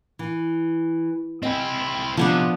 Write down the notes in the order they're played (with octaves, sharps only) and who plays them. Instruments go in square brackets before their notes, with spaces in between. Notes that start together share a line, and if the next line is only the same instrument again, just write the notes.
[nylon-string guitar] E3
[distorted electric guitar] C4 E4 [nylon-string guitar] D#5 G5 G#5
[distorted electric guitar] C3 [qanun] F3 B3 D4